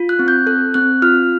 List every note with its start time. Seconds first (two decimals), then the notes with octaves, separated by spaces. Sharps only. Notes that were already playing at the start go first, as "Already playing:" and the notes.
Already playing: F4
0.09 F#6
0.19 C4
0.28 G6
0.46 A4 F#6
0.74 C4 F#6
1.02 F4 F6